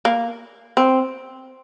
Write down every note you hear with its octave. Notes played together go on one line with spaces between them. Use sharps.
A#3
C4